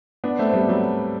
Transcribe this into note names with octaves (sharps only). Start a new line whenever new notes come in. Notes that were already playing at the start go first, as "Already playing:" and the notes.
B3 D4
A3 C4
C4
G3 B3
F#3 A3